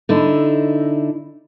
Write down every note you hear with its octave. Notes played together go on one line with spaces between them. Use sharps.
D3 D#4 E4